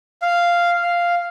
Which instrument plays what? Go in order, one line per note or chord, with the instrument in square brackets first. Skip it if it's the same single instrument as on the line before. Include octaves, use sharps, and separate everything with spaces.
[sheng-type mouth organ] F5
F5